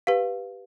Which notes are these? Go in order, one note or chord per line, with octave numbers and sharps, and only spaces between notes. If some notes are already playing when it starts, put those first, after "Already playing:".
G4 B4 F5